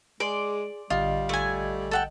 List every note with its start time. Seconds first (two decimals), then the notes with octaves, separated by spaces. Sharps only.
0.20 G#3 G#4 D5 C6
0.90 A1 D3 G3 F4 D#5
1.29 A3 G#5
1.91 A4 F#5 G5